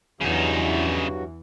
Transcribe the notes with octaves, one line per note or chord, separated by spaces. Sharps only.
E2 G2 C#3 E3 F#3 D#4 F#4